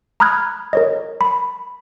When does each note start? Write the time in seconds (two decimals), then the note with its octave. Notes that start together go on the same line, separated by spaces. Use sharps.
0.20 A#5 B5 D#6 F6 F#6 G#6
0.73 A#4 C#5 D#5
1.21 B5